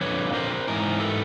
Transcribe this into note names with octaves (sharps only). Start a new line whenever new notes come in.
F2 D3 F3 B4 C#5
A#4 C5
G#2 E3 A#4
A4 B4